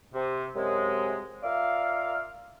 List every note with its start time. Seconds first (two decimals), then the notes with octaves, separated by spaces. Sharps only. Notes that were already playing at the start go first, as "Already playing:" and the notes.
0.14 C3
0.56 F#2 C3 G#3
1.43 F4 A#4 D5 E5 F5